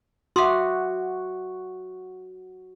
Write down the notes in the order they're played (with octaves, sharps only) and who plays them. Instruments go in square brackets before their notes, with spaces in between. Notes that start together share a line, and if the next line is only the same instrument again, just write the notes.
[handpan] F#4 [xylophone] E5 D6 D#6 [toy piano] C6